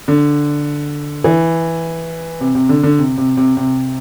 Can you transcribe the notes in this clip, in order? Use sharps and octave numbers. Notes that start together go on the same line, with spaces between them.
D3
E3
C3
C3
D3
D3
C3
C3
C3
C3